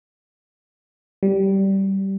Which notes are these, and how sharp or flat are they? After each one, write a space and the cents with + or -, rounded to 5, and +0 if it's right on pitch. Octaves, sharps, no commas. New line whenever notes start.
G3 -15